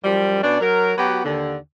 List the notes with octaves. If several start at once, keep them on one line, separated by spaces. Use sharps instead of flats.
F#2 F3 G3
B2 C#4 D4
F#3 A#4
F#3 B3 F#4 G4 B4
D#2 D3